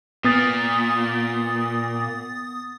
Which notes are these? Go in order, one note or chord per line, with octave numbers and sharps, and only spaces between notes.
A#2 B3 D#6 A6